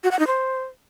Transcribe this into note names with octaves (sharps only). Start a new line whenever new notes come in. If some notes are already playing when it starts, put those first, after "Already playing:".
F#4
F#5
D#4
C5